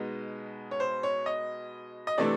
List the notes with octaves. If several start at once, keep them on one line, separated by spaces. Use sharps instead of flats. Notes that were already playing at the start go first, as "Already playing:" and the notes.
Already playing: B2 G#3 B3 D#4
C#5
C5
C#5
D#5
D#5
C3 E3 A3 D4 D5